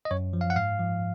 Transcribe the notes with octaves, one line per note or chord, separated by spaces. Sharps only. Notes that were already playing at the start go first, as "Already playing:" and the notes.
D#5
F#2 C#5
F3
F5
F#5
G#2 F5
F3